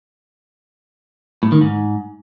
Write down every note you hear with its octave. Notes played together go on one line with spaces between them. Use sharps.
A2
D#3
G#2